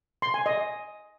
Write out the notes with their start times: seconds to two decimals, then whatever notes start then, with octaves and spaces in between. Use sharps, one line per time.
0.22 C6
0.34 G#5
0.46 D#5